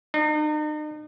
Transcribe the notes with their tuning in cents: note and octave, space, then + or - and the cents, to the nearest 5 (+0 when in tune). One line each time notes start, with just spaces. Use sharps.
D#4 -40